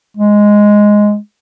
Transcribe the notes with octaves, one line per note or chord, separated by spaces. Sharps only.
G#3